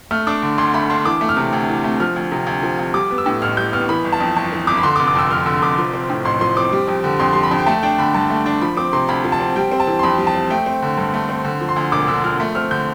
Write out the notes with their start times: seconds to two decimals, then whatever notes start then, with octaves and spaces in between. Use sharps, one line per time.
0.11 A3 F6
0.27 D4 D6
0.43 D3
0.58 D2 C6
0.74 A3 B5
0.90 D4 C6
1.05 E3 D6
1.21 A3
1.29 F6
1.37 C3
1.53 D2
1.68 E3
1.84 A3
2.00 F3 F6
2.16 D2
2.32 C3
2.47 D2
2.63 F3
2.79 D2
2.94 G3 D6
3.11 B3
3.18 E6
3.26 A2
3.42 A1 F6
3.57 G3 G6
3.73 B3 F6
3.89 E3 B5
4.04 G1
4.12 A5
4.20 F2
4.36 G1 A5
4.52 E3
4.67 G1 D6
4.77 B5
4.83 D3 C6
4.96 D6
4.99 F1
5.07 D6
5.15 F2 E6
5.31 F1 F6
5.46 D3 E6
5.62 F1 D6
5.78 F3
5.94 C4
6.10 A2
6.25 A1 C6
6.41 F3 C6
6.57 C4 D6
6.73 G3
6.88 F2
7.04 D3
7.20 F2 C6
7.33 G3 C6
7.43 B5
7.51 F2
7.59 G5
7.66 A3 A5
7.83 D4 G5
7.98 D3 B5
8.14 G2 A5
8.30 A3
8.46 D4
8.61 F3 B5
8.77 C4 D6
8.93 C3 C6
9.09 D2 B5
9.24 F3
9.32 A5
9.40 C4
9.56 G3 G5
9.72 C4
9.80 A5
9.87 E3
9.99 C6
10.03 F2 B5
10.18 G3
10.27 A5
10.35 C4
10.50 A3 G5
10.66 C4
10.82 D3
10.98 G2
11.14 A3
11.29 C4
11.45 D3
11.61 F3
11.69 C6
11.76 D2
11.92 E1 D6
12.08 D3 E6
12.24 F3 F6
12.40 A3
12.55 C4 F6
12.71 D3 G6